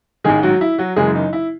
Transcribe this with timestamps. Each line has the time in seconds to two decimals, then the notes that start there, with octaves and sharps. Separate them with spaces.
0.24 A1 G#2 D#3 G#3 G#4
0.43 F#3 F#4
0.61 E4
0.78 F#3 F#4
0.96 F#1 F#2 C#3 E3 G#3 G#4
1.15 D#4
1.33 E4